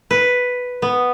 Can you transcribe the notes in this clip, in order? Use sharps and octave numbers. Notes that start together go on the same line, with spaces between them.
B4
B3